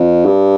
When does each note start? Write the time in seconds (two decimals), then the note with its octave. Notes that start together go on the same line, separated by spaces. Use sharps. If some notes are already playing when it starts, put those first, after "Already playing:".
Already playing: F2
0.26 G2